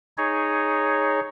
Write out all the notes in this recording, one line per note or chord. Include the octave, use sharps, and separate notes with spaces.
D#4 G#4 C#5